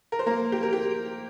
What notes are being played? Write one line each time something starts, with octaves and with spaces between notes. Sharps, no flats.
A#4
C5
A#3 A#4
G4
A#4
G4